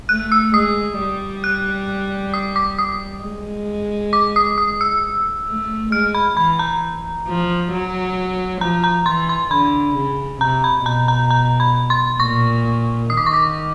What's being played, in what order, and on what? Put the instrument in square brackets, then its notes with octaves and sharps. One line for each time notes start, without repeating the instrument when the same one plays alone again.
[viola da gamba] A3 [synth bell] F#6
[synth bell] E6
[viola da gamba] G#3 [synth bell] D#6
[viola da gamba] G3
[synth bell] F#6
D#6
D6
D#6
[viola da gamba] G#3
[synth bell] D6
D#6
D#6
E6
[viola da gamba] A3
[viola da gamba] G#3 [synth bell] F6
[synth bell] B5
[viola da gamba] E3 [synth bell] B5
[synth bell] A#5
[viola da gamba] F3
F#3
[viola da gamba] F3 [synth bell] A#5
[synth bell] A#5
[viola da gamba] E3 [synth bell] C6
[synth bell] C6
[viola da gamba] D3 [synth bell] B5
[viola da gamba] C#3
[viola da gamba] C3 [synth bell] A#5
[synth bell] B5
[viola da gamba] B2 [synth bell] A#5
[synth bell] A#5
A#5
B5
C6
[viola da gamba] A#2 [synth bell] C#6
[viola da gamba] D#3 [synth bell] D#6
[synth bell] D6
C#6
D6